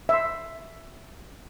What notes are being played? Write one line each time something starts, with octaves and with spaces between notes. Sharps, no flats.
E5 C6